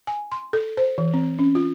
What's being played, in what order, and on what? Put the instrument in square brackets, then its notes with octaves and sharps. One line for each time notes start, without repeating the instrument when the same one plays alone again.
[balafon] G#5
C6
A4
C5
E3
C4
C#4
F4